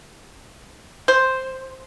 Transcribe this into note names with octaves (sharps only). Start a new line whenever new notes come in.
C5